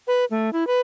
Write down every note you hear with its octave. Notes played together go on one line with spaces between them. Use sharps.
B4
A3
E4
B4